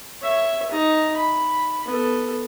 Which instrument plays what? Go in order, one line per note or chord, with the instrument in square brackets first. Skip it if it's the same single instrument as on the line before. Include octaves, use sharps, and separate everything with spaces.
[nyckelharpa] C#5 E5
D#4 A#5
B5
B3 A4